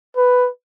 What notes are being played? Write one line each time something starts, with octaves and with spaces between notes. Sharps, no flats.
B4